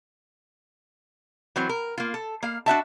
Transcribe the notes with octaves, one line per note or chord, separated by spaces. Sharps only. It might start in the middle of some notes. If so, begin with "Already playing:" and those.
E3 F#3 C4
A#4
A#3 F4
A4
A#3 F5
D4 F#4 E5 A5